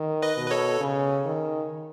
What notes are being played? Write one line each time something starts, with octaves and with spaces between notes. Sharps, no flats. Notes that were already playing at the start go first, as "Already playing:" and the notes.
Already playing: D#3
B4 D#5
B2
B4
A4 C#5
C#3
D#3